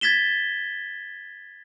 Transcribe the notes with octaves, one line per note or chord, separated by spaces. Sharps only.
G#6 A6 B6 E7 G7